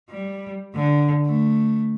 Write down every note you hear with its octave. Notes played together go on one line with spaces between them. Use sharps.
G3
D3
A3